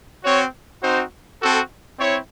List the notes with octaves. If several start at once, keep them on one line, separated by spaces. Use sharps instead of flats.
C4 F#4 C#5
C4 D#4 F#4 C5
C4 F#4 A4
C4 E4 C#5